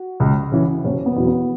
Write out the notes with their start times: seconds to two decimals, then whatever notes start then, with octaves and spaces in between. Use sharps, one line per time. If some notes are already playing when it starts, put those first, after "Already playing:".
Already playing: F#4
0.20 C#2
0.52 C#3 E3
0.84 F#1 C#4
1.06 B3
1.16 E2 B2 F#3
1.27 B3